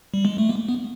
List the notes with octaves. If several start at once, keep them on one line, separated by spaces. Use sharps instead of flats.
G3
G#3
A3
A#3
B3